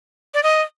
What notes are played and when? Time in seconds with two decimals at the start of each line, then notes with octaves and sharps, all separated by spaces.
0.34 D5
0.43 D#5